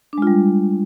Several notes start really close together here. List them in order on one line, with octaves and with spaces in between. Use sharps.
D4 G#3 F4 G3